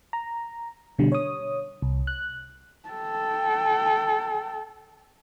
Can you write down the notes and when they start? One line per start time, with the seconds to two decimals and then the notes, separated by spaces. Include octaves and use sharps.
0.13 A#5
0.98 B2 D3 G3
1.12 C#5 D#6
1.82 C2
2.07 F#6
2.89 A4 G5